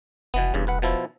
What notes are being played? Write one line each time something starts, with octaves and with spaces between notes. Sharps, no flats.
F1 B2 E3 B3
E1 E2 G2 C#3
C2 B4 F#5
B2 F3 E4